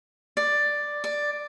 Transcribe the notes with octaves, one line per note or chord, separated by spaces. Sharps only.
D5
D5